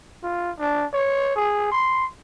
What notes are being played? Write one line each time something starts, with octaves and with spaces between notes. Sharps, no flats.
F4
D4
C#5
G#4
C6